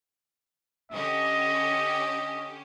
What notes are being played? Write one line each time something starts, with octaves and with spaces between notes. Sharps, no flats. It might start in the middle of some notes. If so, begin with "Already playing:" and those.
D3 C#4 G4 D#5